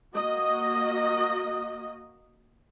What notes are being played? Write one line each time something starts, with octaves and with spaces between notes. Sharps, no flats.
A#3 F#4 D#5